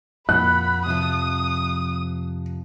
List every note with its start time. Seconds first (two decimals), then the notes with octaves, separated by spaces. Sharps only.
0.29 F2 A#2 F#5 B5 F#6
0.86 C3 F3 D#6